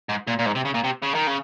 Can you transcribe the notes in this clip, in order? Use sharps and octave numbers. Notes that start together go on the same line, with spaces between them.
G#2
A#2
A#2
G#2
C3
C#3
A#2
C3
C#3
D#3
C#3